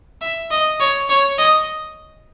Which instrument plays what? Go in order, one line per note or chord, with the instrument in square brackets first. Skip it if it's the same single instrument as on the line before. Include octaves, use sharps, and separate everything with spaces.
[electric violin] E5
D#5
C#5
C#5
D#5